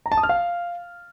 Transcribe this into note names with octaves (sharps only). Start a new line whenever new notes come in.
A#5
A5
D#6
F6
F5